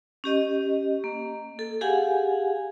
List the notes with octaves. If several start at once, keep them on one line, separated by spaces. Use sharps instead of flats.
C#4 G4 D#5
A#3
A4
G4 G#4 F5 F#5 G#5